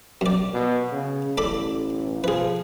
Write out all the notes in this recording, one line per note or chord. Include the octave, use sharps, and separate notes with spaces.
F#2 D5
B2
C#3
A1 A4 D5 B5
F3 G#4 B4